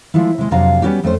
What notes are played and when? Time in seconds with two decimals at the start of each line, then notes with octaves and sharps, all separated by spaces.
0.14 F3 G#3 A3 E4
0.38 C3 G#3
0.51 F2 C3 F#3 D4 F5 A#5
0.82 G3 B3 C#4 F#4 G4
1.03 F2 A3 C#4 C5